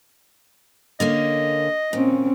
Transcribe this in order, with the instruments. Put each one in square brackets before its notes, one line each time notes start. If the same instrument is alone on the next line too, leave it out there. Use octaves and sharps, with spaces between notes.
[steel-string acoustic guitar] D3 A#3 C#4 [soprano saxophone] D#5
[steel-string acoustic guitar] A#2 [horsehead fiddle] C4 C#4